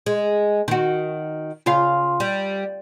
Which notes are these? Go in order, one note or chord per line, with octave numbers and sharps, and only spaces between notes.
G#3
D#3 F#4
C#3 F4 F5
G3